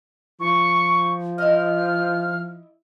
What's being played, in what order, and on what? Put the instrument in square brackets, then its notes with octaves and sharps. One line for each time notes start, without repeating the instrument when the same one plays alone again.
[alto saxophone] F3 [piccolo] C#6
[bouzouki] E4 D#5 [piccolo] F6